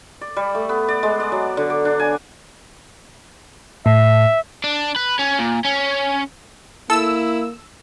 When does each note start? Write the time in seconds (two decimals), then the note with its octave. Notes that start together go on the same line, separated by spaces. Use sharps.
0.21 D5
0.36 G3
0.55 A3
0.69 B3
0.89 D5
1.03 G#3
1.20 D5
1.32 F#3
1.57 D3
1.70 D6
1.85 D4
2.00 G#5
3.86 A2 E5
4.64 D4
4.96 B4
5.19 C#4
5.39 A#2
5.65 C#4
6.90 A#3 E4 A4 E6